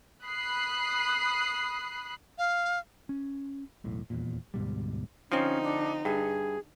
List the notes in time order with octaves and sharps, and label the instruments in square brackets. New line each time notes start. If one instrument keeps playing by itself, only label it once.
[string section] B5 D#6 F#6 C7
[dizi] F5
[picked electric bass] C#4
E1 B1 A2
D#1 E2 A#2
D2 G#2 B2 G3
[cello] D3 D#4 [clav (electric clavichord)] F3 C4 [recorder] C#4
[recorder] D4
[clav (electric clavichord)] G2 [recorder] G#4